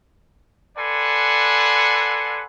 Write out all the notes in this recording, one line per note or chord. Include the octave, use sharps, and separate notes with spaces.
A4 B4 D5 F#5 G#5 C6